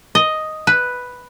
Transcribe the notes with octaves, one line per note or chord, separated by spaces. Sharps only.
D#5
B4